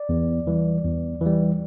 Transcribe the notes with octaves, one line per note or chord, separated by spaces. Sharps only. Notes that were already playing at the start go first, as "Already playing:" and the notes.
Already playing: D5
E2
E3 G3
E2
E3 G3